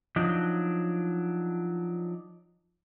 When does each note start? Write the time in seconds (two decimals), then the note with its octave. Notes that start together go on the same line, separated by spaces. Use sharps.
0.16 F3 F#3 D4 D#4